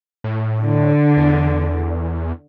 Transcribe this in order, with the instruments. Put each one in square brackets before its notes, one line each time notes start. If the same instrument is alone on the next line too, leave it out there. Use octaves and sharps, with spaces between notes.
[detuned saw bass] A2
[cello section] D3
[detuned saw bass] E2